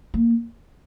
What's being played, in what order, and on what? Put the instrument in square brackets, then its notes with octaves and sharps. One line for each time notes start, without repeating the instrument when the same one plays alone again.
[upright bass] A#3